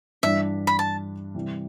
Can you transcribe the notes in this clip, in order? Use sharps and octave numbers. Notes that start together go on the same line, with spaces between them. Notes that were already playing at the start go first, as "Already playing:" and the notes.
G2 E3 G3 D4 E5
B5
A5
C3 E3 G3